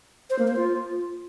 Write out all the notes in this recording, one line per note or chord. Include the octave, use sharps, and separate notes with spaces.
C5
A#3
C5
F4